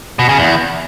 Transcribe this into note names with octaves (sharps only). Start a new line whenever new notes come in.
B2
C#3
E2